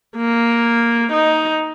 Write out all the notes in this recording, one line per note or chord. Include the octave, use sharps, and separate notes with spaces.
A#3
D#4